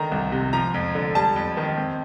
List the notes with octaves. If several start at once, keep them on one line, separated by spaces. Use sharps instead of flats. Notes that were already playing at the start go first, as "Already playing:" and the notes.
Already playing: D3 D#3 A#5
C2
C3
F3 A#5
F2
D3
G3 A5
F2
D#3
C4